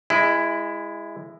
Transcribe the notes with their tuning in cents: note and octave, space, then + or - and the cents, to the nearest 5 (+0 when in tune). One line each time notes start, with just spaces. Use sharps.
G#3 -15 E4 +10 G#5 +0